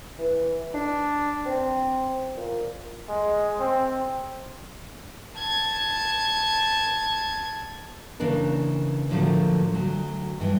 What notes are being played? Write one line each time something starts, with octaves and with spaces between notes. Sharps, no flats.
E3
D4
C4
A#2
G#3
C4
A5 G#6
C#3 E3 A#3 D4 A#4
A2 D3 F3 F#3 A3 A#3
D2 F#3
G2 E3 E4